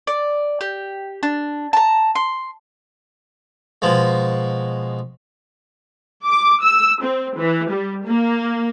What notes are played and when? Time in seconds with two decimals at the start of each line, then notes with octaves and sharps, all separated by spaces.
0.07 D5
0.61 G4
1.23 D4
1.73 A5 A#5
2.15 C6
3.82 B2 F3 G#3
6.25 D6
6.62 E6
7.01 C4
7.36 E3
7.69 G3
8.05 A#3